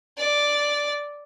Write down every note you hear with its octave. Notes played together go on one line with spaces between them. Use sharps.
D5